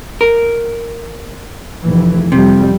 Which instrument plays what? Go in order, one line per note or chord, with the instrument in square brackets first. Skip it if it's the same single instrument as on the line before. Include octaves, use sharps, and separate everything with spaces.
[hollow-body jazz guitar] A#4
[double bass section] F1 E3
[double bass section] F2 G3 [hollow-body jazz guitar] C3